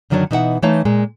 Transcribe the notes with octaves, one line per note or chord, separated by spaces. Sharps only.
F#2 D3 D#3 F#3 D4 C#5
B2 E3 D#4 G4 E5 F#5
E3 A3 D#4 C#5 F5 A5
A#2 G#3